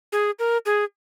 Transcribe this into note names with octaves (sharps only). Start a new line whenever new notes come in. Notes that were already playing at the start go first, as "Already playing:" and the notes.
G#4
A#4
G#4